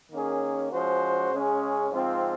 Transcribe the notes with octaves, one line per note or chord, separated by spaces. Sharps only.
D#3 A#3 C#4 G#4
F3 G#3 C#4 F#4 C5
C#3 G#3 C#4 G#4
G#2 F3 C4 F4